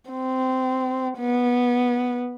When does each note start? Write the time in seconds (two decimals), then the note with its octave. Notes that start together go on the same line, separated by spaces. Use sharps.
0.11 C4
1.19 B3